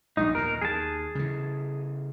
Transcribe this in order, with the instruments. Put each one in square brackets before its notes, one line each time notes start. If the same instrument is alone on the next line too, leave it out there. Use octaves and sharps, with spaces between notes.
[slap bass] A#1 G2 [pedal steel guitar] D#4
[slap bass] D#2 A#2 [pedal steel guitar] A#4
[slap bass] D#2 [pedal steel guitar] G#4 A5
[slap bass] C#3 E3